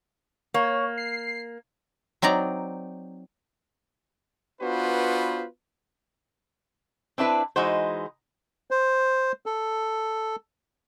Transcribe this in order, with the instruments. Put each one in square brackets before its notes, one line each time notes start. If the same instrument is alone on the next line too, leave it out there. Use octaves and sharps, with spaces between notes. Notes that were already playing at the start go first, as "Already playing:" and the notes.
[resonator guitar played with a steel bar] A#3 [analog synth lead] C#5
[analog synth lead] C7
[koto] F#3 C4 D#4 D5 A#5
[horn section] B3 D4 F4 F#4 B4 C5
[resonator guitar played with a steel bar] C4 D4 E4 B4
E3 G#3 D#4 F#4 C5
[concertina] C5
A4